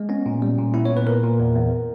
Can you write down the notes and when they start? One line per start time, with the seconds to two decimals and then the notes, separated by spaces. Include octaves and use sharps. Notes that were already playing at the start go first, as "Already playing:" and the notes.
Already playing: G#3
0.09 B3 C#4
0.26 A#2
0.42 G3
0.58 A#2
0.74 B3 E4
0.85 A#2 C#5
0.97 B4
1.07 A#2 A#4
1.24 A#2
1.40 E2
1.55 E2